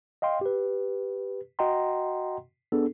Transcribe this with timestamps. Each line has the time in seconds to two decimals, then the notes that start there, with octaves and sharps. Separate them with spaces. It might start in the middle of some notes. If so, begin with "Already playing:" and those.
0.22 D#5 F5 G5 C6
0.41 G4 B4
1.59 F#4 D#5 F#5 G5 A#5 C6
2.72 B3 D4 G#4 A4